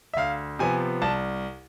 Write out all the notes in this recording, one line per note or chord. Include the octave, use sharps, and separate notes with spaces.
E5
D2 F5
C3 F3 B3 G#5
C2 A5